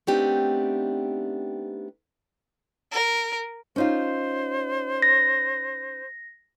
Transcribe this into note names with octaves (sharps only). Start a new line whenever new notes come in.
A3 B3 C4 D4 D#4 G4
A#4
C#4 D#4 F4 C5
A#6